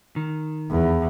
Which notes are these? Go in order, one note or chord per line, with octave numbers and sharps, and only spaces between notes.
D#3
E2